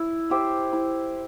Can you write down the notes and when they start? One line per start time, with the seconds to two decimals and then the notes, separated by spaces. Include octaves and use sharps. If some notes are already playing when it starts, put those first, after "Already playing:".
Already playing: E4
0.30 G4 C5 E5
0.73 E4